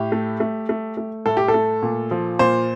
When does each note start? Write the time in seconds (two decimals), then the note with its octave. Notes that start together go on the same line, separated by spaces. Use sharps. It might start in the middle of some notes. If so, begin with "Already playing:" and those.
Already playing: A2 G4
0.12 A3
0.40 A3
0.69 A3
0.97 A3
1.26 A2 A4
1.37 G4
1.48 A4
1.54 A3
1.83 A#2
2.11 F3
2.39 A#2 C5